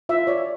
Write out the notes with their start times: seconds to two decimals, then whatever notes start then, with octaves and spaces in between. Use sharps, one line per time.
0.09 F4 E5
0.27 C#5 D5